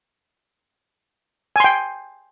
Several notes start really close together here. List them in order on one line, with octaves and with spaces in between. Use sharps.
G#5 C6 G5